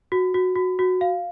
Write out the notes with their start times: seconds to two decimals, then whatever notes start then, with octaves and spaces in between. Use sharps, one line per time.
0.12 F#4
0.34 F#4
0.55 F#4
0.79 F#4
1.01 F5